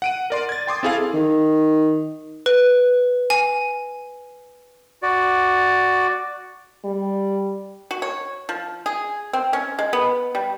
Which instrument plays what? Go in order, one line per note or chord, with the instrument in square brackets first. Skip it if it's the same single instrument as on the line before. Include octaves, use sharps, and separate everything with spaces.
[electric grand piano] F#5 D7 D#7
A#4 D5 C6
G#6 A6
G5 C6 D6 D#6
C4 E4 G#4 A4 F5 G#5
[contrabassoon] D#3
[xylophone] B4
G#5
[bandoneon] F#4 D5
[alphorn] G3
[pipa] F#4
C#5
F3
G#4
C4
C#4
G#3
B3
G3